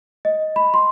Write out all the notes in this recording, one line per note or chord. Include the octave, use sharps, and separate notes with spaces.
D#5
B5
C6